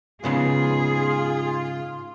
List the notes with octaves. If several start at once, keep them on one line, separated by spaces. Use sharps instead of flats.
G#2 C#3 B3 F4 G#4